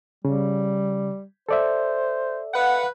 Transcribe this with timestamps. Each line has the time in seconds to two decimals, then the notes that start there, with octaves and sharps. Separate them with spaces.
0.25 C#3 G3
1.49 A4 C5 D5 E5
2.53 B4 F5 F#5